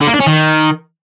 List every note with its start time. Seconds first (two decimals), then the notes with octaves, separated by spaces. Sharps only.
0.01 D3
0.07 A#3
0.14 D4
0.20 C#4
0.27 D#3